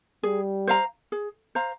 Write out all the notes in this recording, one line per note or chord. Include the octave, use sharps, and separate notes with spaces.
G3 G#4
C5 F5 A#5
G#4
C5 F5 A#5